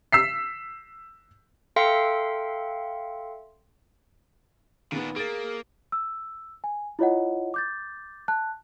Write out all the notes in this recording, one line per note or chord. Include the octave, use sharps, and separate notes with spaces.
E6 B6 C7
A4 E5 F5 G5 C6 C#7
A#2 D#3 B3 D4
A#3 G#4 A#4 A6 D7
E6
G#5
E4 F4 C#5 D#5 F#5
D6 G6 A6
A5 F#6